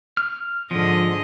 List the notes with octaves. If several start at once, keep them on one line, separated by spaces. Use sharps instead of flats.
F6
G#2 D3 F3 D#5